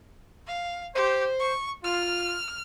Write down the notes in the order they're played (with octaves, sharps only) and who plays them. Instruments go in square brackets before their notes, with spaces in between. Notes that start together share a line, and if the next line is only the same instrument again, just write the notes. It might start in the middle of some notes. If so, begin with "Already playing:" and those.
[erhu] F5
[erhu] G4 [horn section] C5
[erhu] C#6
[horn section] F4 [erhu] F6